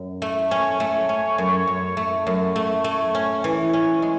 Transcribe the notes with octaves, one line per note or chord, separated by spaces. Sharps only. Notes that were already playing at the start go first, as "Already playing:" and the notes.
Already playing: F#2
A3
C#4 C#5
A3
C#4
F#2
F#2
A3
F#2 C#5
A3
A3
C#4
E3
C#4
G#3